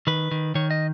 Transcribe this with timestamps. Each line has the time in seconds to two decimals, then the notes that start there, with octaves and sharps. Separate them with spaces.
0.07 D#3 B4
0.31 D#3
0.55 D#3 C#5
0.71 D#5